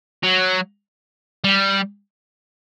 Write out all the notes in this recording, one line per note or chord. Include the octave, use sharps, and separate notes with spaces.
F#3
G3